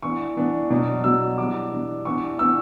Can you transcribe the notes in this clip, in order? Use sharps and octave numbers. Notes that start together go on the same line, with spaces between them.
E3 B3 D4 C#6
E3 B3 D4
B2 F#3 B3 D4
B2 F#3 B3 D4 E6
E3 G3 B3 D4 D6
E3 G3 B3 D4
E3 B3 D4 C#6
E3 B3 D4 E6